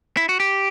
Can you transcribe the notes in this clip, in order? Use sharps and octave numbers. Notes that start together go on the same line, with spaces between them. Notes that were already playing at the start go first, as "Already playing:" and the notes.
E4
F#4
G4